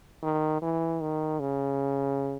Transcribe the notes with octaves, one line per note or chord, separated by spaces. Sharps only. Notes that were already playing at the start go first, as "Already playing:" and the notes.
D#3
E3
D#3
C#3